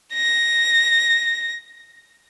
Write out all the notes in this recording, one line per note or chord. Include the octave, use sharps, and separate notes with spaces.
A#6